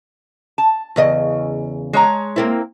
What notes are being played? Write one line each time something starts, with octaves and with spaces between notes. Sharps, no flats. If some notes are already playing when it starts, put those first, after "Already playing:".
A5
E2 C#3 D#5
G#3 C#5 A#5
A#3 C4 E4